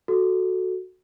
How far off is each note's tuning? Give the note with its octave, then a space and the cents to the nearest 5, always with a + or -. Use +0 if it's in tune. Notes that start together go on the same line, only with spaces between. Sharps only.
F#4 +0 A4 +0